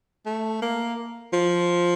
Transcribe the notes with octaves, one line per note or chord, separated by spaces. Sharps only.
A3
A#3
F3